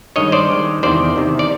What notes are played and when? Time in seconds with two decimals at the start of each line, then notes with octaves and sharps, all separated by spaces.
0.16 G2 D#3 G#3 C#5 D#5
0.32 C5 D5
0.50 G2 D#3 G#3
0.83 E2 C3 D#3 C5 D5
1.16 E2 C3 D#3
1.39 D5